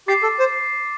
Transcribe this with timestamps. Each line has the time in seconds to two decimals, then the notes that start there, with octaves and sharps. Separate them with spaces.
0.08 G4 D6 A6 C7
0.23 A4
0.39 C5